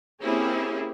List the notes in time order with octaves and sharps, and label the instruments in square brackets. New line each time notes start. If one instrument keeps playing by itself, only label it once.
[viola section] A#3 C4 C#4 E4 G4 G#4